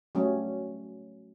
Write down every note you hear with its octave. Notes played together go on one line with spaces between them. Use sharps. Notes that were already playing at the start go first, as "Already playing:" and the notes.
F#3 G3 A3 C#4